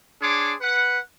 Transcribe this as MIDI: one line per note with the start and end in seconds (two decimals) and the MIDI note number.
0.22 0.54 62
0.22 0.54 68
0.22 0.54 73
0.22 0.54 84
0.22 0.54 86
0.61 0.99 71
0.61 0.99 78